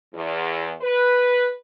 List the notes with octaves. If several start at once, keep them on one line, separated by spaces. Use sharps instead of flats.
E2
B4